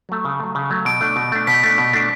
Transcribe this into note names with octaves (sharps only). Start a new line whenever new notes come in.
F#3 A3
C#3
F#3 A3
C#3
F#3 A3
B2 D7
A3 D4
B2
A3 D4
B2 B6
A3 D4
B2
A3 D4